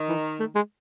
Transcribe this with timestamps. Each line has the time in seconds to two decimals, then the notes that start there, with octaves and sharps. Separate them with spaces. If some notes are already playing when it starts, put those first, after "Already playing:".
Already playing: D#3
0.09 E3
0.40 A3
0.55 G#3